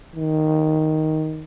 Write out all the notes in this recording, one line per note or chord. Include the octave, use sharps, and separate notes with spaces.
D#3